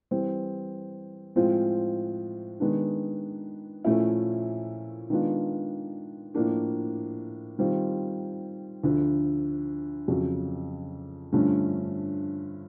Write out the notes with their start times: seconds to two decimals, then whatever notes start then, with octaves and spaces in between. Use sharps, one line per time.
0.11 E3 G3 C4
1.36 A2 F3 G#3 C4 F4
2.60 D#3 G#3 B3 D4
3.85 A#2 F3 A3 C#4 E4
5.10 D#3 G#3 B3 D4 F4
6.34 A2 F3 A#3 D4
7.59 D#3 G3 C4 F4
8.83 D2 D3 F3
10.08 F2 C#3 F#3
11.33 G2 D3 F3 A3 C#4